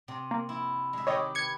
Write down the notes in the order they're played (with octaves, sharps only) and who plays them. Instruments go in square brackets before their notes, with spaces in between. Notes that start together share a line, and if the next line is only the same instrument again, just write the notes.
[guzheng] C3
[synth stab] A#3
[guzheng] E4
G#3 E5
[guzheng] D#3 G4 G5 [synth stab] C#5 D#5
[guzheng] B4 [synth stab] G#6 C#7